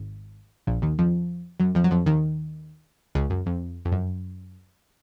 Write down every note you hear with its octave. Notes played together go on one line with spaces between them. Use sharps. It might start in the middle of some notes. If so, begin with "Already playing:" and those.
Already playing: G#1 G#2
A#1 A#2
D#2 D#3
F2 F3
F#2 F#3
F2 F3
F#3
F2 F3
D#2 D#3
C#2 C#3
F#2
F2
F2
F#2